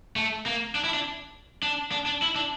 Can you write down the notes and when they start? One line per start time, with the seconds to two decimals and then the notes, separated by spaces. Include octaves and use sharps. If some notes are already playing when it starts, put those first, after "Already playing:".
0.16 A3
0.46 A#3
0.75 D4
0.84 E4
0.94 D4
1.63 D4
1.92 D4
2.06 D4
2.22 E4
2.36 D4